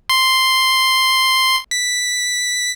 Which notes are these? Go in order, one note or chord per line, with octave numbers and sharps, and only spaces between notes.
C6
B6